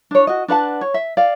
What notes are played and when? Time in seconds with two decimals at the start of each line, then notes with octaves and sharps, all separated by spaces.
0.11 D4 C#5
0.27 F#4 D#5
0.48 D4 B4 F#5 A5
0.81 C#5
0.94 E5
1.17 D5 F5